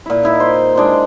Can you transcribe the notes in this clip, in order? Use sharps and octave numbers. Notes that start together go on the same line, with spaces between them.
A#2 E4
D#4 E4 E5
F4 C5
G#3 D4 E4 C6